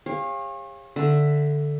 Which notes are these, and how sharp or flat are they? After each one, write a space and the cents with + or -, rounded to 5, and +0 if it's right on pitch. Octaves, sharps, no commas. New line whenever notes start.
G4 +45 C#5 -35 F5 +0
D3 +0 E5 +5